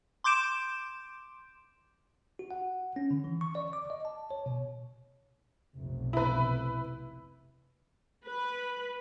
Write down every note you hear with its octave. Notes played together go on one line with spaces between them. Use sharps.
C6 D6 G6 D7 E7
F#4
F#5
C#4
D3
E3
C#6
D5
D6
D#5
A5
C#5
B2
F1 B1
E4 B4
B4